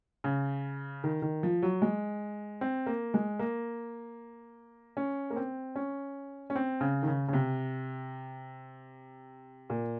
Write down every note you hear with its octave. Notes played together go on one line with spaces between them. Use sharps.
C#3
D#3
D#3
F3
F#3
G#3
C4
A#3
G#3
A#3
C#4
A#3
C4
C#4
C#4
C4
C#3
D#3
C#3
C#3
C3
A#2